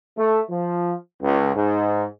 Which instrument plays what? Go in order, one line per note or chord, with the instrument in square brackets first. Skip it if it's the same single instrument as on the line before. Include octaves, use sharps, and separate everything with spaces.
[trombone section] A3
F3
C#2
G#2